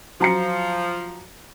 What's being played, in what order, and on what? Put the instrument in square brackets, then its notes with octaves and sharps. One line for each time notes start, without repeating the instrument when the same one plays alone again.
[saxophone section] F3 [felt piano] F#3 A#5 C#7